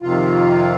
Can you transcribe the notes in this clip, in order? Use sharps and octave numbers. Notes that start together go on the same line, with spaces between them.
F2 C3 D#3 F4